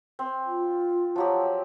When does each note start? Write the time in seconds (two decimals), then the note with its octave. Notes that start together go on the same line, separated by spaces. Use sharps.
0.19 C4
0.46 F4
1.16 F3 F#3 G4